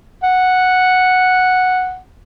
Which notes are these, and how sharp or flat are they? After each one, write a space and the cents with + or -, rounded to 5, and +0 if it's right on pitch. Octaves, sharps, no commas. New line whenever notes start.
F#5 -5